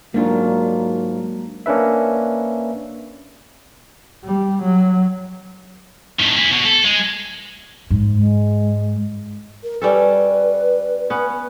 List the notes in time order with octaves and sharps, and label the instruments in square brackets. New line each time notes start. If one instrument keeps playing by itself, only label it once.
[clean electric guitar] G#2 F4 [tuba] F#3 [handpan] A#3 D4 A#4
[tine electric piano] A#3 C#4 D4 B4 E5
[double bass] G3
F#3
[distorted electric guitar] A2 D#3
E4 G#4
B2
A4
G#3
[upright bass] G#2
[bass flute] G#3
[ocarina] A#4
[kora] G3 C#4 A4 [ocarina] B4
[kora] B3 C#4